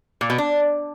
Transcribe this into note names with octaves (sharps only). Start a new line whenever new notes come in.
A#2
B2
D4